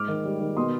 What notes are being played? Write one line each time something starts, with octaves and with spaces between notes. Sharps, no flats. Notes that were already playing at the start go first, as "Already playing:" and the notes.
Already playing: G#2 D6 F6
D#3
G3
D#3
B2 C6 D#6